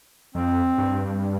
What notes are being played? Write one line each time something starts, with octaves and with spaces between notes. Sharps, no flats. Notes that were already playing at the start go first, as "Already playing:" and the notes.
F2 C4
G2